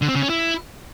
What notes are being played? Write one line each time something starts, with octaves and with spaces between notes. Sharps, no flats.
D3
C4
C#3
C#4
E4